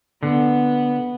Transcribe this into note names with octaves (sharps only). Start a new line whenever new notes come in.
D3 B3